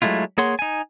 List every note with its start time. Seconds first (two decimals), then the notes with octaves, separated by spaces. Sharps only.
0.02 F#3 G#3 A3 E4 F4
0.38 A#3 G#4 C#5 F#5 C6
0.59 D#4 G#5